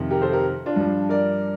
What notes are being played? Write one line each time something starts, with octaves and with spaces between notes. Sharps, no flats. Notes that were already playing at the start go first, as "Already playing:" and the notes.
Already playing: F2 C3 D#3
G4 A#4
A4 C5
G4 A#4
D4 F4
G2 F3
A#4 D5